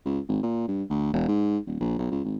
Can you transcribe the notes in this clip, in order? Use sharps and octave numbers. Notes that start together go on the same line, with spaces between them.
C#2
G#1
A#2
G2
D2
E1
G#2
D#1
A#1
B1
C#2
G#1